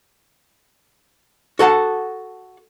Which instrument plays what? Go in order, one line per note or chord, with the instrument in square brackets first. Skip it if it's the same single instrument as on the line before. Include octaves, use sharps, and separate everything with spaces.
[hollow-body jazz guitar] F#4 A4 F#5 A5